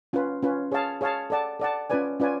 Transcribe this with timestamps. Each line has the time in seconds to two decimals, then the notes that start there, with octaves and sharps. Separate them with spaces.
0.13 C#4 F4 B4
0.43 C#4 F4 B4
0.72 G#4 C#5 F5 A5
1.01 G#4 C#5 F5 A5
1.30 A4 D5 F#5 A5
1.59 A4 D5 F#5 A5
1.90 C#4 F4 B4 D5 G#5
2.20 C#4 F4 B4 D5 G#5